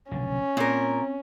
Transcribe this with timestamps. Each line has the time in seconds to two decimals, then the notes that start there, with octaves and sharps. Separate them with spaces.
0.11 F1 B1 D3 C#4
0.57 A#2 C4 A#4